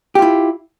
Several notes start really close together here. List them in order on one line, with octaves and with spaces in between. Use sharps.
G4 F4 E4